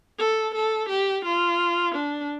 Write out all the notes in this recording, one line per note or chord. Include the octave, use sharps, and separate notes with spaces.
A4
A4
G4
F4
D4